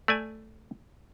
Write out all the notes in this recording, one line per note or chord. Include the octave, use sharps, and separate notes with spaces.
A3 D5 G#5